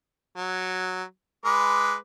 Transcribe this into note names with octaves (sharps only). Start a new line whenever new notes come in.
F#3
G#3 B4 D6